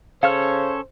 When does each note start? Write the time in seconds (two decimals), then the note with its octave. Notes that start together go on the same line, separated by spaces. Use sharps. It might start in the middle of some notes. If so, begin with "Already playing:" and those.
0.23 C#3 C#4 A4 C5 C#5 F5 F6